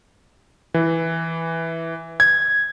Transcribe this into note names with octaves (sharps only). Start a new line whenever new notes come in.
E3
G#6